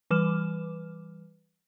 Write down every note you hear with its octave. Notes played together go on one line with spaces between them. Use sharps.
E3 G3 B4 D6 F6 E7